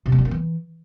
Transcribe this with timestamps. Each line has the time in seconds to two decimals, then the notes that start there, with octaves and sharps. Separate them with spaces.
0.06 C3
0.12 A3
0.18 G3
0.25 A#3
0.31 E3